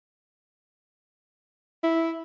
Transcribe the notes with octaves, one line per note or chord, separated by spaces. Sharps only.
E4